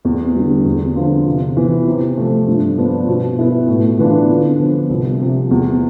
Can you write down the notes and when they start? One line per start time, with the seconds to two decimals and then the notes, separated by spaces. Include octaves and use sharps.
0.05 E2
0.35 D3 G3
0.65 E2
0.96 D3 F3 B3 F4
1.26 C3
1.57 E3 B3
1.87 C3
2.17 F3 A3
2.47 G2
2.77 F3 B3 D4
3.08 B2
3.39 B3 E4
3.68 A2
3.99 E3 B3 D4 F4
4.30 D3
4.60 F3 B3
4.90 C2
5.20 C3 F3
5.51 E2